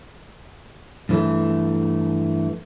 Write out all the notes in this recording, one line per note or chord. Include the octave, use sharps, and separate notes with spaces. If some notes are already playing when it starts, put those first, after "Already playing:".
G2 E3 A3